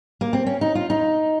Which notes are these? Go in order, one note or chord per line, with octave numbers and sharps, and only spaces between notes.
A#3
C4
C#4
D#4
F4
D#4